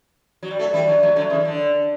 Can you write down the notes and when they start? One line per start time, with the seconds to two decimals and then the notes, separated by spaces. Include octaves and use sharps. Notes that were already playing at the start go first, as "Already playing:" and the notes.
0.43 F#3
0.51 G3
0.59 F#3 A3
0.74 E3 G3
0.88 D3 F#3
1.03 F#3 A3
1.16 D3 F#3
1.30 C#3 E3
1.40 E3
1.45 D3